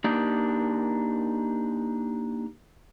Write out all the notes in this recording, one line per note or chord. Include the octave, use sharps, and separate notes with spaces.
A#3 D4 D#4 G4